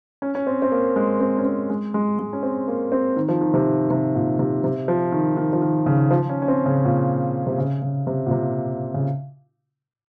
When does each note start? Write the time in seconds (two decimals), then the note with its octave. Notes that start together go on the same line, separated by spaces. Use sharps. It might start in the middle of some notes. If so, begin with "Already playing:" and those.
0.22 C#4
0.35 C#4
0.47 C4
0.62 C4
0.72 A#3
0.96 G#3
1.20 C4
1.38 C#4
1.45 C4
1.70 G#3
1.94 G#3
2.19 G#3
2.33 C#4
2.43 C4
2.68 A#3
2.92 C4
3.16 D#3
3.29 F3
3.41 D#3
3.54 C3
3.90 C3
4.15 A#2
4.39 C3
4.64 C3
4.88 F3
5.12 D#3
5.37 D#3
5.53 F3
5.62 D#3
5.86 C#3
6.11 F3
6.29 C#4
6.42 C#4
6.48 C4
6.66 C#3
6.85 A#2
7.47 C3
7.58 C#3
7.82 C#3
8.07 C3
8.26 A#2
8.31 C3
8.94 C#3